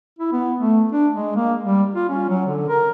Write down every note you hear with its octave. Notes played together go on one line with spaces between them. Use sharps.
E4
B3
A3
D4
G#3
A#3
G3
F4
C#4
F#3
D3
A#4